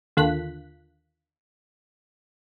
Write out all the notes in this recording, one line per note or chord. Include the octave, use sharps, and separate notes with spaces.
D#2 D3 F4 F#6 B6